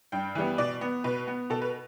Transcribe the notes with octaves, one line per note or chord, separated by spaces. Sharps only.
G2 G5
E3 G3 B3
B2 D5
B3
B2 B4
B3
B2 A4
B4